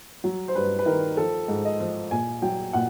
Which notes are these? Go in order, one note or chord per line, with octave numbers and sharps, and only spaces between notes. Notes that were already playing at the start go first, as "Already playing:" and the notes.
F#3
C5
G2 B4
B4
D#3 A#4
F3 A4
G#2
D#5
F3
A#2 G#5
F#3 G5
A#2 F#5